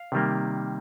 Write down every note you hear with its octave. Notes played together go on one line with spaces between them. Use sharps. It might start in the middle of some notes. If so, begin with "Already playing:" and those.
Already playing: F5
C3 D#3 G3 A#3